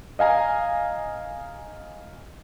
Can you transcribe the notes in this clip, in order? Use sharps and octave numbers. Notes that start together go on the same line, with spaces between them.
D#5 F5 G#5 A#5